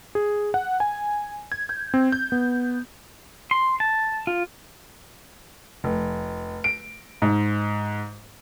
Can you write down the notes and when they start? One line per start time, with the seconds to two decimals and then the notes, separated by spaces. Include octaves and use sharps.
0.15 G#4
0.54 F#5
0.80 G#5
1.52 G#6
1.69 G6
1.94 C4
2.12 G6
2.32 B3
3.51 C6
3.80 A5
4.27 F4
5.84 F1
6.64 D7
7.22 G#2